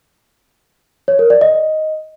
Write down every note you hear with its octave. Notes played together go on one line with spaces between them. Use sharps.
C#5
A#4
D5
D#5